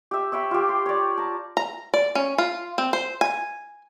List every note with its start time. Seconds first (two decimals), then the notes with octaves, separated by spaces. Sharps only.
0.11 G4 E5
0.32 C#5 E5 G5 B5
0.51 F4 G4
0.69 C6
0.86 C#5 D5
1.17 A5 A#5
1.57 A#5
1.94 D5
2.15 C#4
2.38 F4
2.78 C4
2.93 C5
3.21 G#5